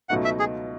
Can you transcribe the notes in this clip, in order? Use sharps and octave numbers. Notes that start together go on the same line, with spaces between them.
C#2 B2 F#3 A3 D#4 F#5
E5
G#4